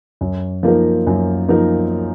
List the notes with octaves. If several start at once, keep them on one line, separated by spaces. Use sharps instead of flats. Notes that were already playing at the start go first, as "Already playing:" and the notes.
F#2
F3 A#3 D#4 A#4
F#2
F3 A#3 D#4 A#4